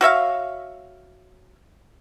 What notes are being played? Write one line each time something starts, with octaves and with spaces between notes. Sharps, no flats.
F#4 C#5 E5 F5